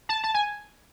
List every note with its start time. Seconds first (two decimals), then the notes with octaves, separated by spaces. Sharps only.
0.09 A5
0.24 A5
0.34 G#5